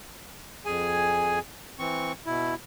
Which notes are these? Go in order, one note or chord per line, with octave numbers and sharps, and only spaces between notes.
F2 G#4 G#5
E3 C4 C#6
B2 E4